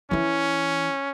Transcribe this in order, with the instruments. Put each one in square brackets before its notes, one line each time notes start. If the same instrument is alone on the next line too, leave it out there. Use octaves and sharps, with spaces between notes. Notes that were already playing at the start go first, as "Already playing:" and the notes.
[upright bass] E3 E4 [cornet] C#4